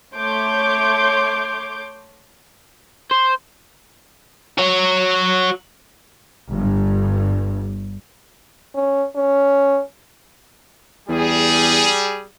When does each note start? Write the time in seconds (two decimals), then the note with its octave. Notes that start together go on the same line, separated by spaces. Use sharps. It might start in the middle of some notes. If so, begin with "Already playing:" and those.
0.17 A3 C#5 C6 D6 G6
3.11 C5
4.58 F#4 C#5
6.51 G1 G2
8.75 C#4
9.16 C#4
11.09 E2 G3 G#4